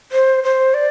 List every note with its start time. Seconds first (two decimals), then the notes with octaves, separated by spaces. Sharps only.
0.12 C5
0.44 C5
0.74 D5